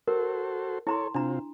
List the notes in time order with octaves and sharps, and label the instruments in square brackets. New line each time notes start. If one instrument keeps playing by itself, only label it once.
[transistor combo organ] F#4 A4 C5 [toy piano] A#4
[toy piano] E4 A#5 C6 [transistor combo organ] A4 C#5
[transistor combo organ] C3 C4 F4 [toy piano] D4 A#5